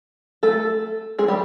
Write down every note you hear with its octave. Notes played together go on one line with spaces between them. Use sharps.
A3 A4
G#3 G#4
G3 G4